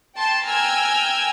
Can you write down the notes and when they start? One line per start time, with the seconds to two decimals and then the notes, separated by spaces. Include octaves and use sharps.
0.17 G5 A5 C6
0.48 G5 G#5 A#5 E6 F6 G#6